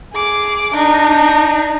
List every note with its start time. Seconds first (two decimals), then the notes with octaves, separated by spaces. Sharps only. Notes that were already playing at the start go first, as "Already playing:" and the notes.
0.14 G#4 D6
0.74 D4 D#4